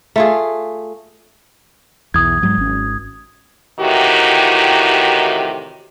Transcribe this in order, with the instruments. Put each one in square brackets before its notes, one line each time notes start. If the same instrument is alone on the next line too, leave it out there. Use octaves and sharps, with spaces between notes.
[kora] A3 F4 G#4
[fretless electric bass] B1 E2 [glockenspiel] D#6 G#6
[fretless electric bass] G#2 F#3 G#3
G#1 C#4
[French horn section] A2 C3 D#3 E3 F#4 G4